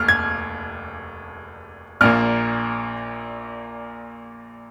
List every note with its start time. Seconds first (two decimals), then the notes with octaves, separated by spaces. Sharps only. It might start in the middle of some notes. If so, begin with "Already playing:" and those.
Already playing: F1 D#2 F6
0.08 G#6
2.01 A#1 A#2 A#3 F6